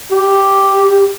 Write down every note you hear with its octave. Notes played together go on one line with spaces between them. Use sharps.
G4